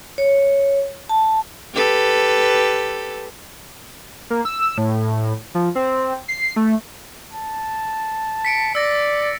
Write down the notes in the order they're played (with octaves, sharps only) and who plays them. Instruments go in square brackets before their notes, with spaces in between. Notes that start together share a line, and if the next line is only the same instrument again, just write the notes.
[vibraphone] C#5
A5
[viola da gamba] G4 A4 B4
[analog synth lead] A#3
E6
A2
F3
C4
C7
A3
[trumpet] A5
[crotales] B6 C#7 D7
[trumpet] D5 [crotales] E6 A6 A#6